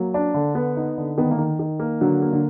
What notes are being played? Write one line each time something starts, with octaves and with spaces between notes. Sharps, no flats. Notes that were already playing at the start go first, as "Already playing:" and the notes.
Already playing: F#3 A#3
D4
D3
B3
D#4
D3
D#3 B3
A#3
D#3
D#3
A#3
D3 F#3
A#3
D3